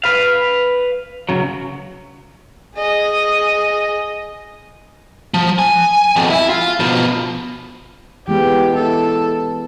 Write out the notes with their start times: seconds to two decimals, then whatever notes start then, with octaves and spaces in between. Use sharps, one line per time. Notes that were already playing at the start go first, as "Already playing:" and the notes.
0.04 B4 F5
1.29 C#3 F#3
2.76 G#4 D#5
5.34 F3
5.59 G#5
6.16 F2 B2
6.30 E4
6.49 F4
6.80 B2 F3
8.28 E3 G#3 B3 G4
8.76 E4 A4